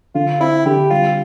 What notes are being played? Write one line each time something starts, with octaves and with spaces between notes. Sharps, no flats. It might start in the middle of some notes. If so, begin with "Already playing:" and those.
D3 F4
C4 E4
D3 G4
G3 F4